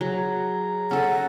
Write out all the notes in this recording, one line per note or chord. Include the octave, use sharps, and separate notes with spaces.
F#3 G#4 A#5
C#4 A4 F#5